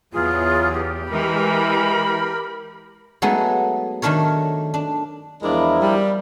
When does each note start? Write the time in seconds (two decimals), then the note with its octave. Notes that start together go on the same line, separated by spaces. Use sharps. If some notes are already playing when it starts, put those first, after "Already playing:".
0.13 E2 E3 F#3 F4 G#4
0.72 G4
1.11 E3 G#3 A#4 B5
3.22 F#3 G#3 A3 B3 D#4
4.02 D#3 A3 D4 A#4 C#5
4.74 D4
5.43 E2 F3 G#3 D4 E4 A#4
5.81 G3